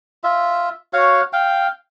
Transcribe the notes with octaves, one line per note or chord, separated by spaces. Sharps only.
F4 E5
F#4 C#5 F5
F5 G5